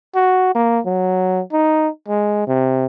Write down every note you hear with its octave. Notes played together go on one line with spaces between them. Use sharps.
F#4
A#3
F#3
D#4
G#3
C3